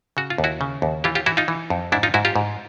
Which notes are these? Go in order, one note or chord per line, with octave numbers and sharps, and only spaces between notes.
C#3 F#4
F4
D#2
E4 F#4
C#3
D#2
E3 F4 G4
F4 G4
E3 E4 F#4
D#4 F4
E3
F2
G#2 D4 E4
D#4 F4
G#2 E4 F#4
F4 G4
G#2